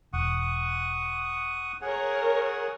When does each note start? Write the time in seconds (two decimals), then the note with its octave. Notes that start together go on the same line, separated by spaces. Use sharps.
0.13 E1 F#5 C#6 D#6
1.81 G#4 A#4 C#5 F#5